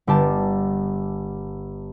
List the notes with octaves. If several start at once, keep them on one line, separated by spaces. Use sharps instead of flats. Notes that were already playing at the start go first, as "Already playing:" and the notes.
G1 G4 A5